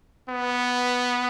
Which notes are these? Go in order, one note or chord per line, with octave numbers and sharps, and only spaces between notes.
B3